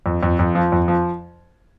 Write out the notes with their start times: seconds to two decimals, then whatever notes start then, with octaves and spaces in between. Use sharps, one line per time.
0.06 F2
0.23 F2
0.39 F2
0.55 F3
0.72 F2
0.88 F3